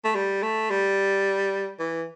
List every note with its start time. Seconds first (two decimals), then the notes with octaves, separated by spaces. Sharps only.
0.04 A3
0.15 G3
0.42 A3
0.70 G3
1.79 E3